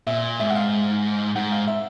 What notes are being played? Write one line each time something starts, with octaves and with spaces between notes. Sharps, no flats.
A#2 E5
G#2 E5
F#5
F5
G#2 F#5
F5
E5